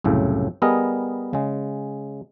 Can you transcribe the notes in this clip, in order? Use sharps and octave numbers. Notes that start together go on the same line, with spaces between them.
C2 F#2 A2 C#3
G3 B3 G#4 A#4 D#5
C#3 G#3